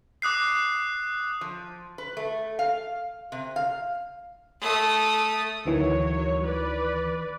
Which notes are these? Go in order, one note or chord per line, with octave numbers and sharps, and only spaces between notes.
D6 D#6 F#6 C7
F3
B4
A3
F5
C3
F5
A3 D#6
D2 D#3 E3 F#3 C#5
B4 D5